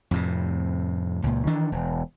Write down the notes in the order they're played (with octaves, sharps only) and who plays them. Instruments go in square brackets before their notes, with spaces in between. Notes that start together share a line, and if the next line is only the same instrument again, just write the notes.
[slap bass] F2 A2 C3
C#2 A#2
D#3 E3 D4
E1